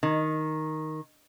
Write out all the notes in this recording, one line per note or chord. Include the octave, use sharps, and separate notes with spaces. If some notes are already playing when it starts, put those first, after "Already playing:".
D#3